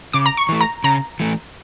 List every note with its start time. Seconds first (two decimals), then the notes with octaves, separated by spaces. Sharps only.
0.13 C#3 D6
0.26 A#5
0.37 C#6
0.49 E3 A3
0.61 A#5
0.84 C#3 A#5
1.20 E3 A3